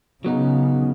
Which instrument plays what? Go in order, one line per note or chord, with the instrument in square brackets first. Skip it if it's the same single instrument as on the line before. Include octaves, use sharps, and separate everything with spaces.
[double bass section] C#3 [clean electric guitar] F#3 B3 D#4